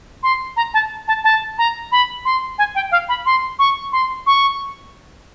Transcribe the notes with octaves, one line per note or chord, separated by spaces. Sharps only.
C6
A#5
A5
A5
A5
A#5
B5
C6
G#5
G5
F5
B5
C6
C#6
C6
C#6